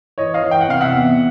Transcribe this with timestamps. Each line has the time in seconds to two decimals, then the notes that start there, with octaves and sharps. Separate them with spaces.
0.18 E3 C#5 D#5
0.34 D#5 F5
0.43 E3
0.51 G5
0.61 F#5
0.68 C3 F5
0.81 E5 F#5
0.93 E2